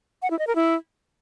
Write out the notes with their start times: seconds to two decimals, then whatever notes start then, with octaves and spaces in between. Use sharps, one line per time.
0.22 F#5
0.31 E4
0.39 D#5
0.47 A#4
0.56 E4